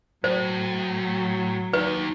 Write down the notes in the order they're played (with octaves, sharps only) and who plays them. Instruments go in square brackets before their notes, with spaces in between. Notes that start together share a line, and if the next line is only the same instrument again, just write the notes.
[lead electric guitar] A2 [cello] F#3 [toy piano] C5
[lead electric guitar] D#2 [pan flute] D#4 [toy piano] B4